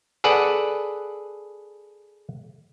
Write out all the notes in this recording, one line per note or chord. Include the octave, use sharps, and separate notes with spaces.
G#4 A4 B4 D5 F#5